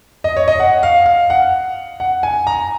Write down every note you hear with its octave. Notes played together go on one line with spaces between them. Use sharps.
D#5
C#5
D#5
F#5
F5
F5
F#5
F#5
G#5
A#5